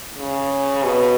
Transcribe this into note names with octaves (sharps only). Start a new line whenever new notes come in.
C#3
B2